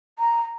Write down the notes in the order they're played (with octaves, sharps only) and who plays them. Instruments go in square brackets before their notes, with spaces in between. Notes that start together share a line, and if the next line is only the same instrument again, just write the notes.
[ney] A#5